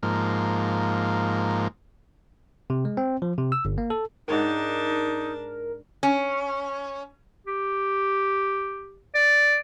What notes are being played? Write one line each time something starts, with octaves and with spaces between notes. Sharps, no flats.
G#2 F3 A#3
C3
G#3
C4
F3
C3
E6
G1
A#3
A4
G#2 D4 D#4 A#4 C#5 G5 A5
C#4
G4
D5